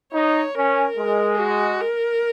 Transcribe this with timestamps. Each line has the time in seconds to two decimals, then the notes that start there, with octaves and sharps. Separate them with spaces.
0.13 D#4 C#5
0.55 C#4 A#4
0.97 G#3
1.39 F#4
1.81 A#4